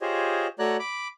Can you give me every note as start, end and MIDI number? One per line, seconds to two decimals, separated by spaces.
0.01 0.47 65
0.01 0.47 67
0.01 0.47 68
0.01 0.47 72
0.01 0.47 73
0.01 0.47 75
0.59 0.77 57
0.59 0.77 66
0.59 0.77 73
0.59 0.77 74
0.59 0.77 82
0.59 0.77 90
0.79 1.08 83
0.79 1.08 86